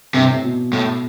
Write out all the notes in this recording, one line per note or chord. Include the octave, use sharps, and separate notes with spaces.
G2 C3
A2
B2
A2